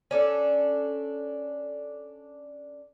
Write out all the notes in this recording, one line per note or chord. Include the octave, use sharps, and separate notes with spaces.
C#4 D4 A4